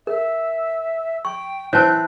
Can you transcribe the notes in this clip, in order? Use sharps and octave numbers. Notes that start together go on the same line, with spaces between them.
A#4 E5
G5 C#6
E3 C4 C#5 A5 F#6